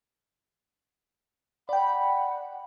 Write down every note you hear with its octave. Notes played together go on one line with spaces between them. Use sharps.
D5 F#5 G5 B5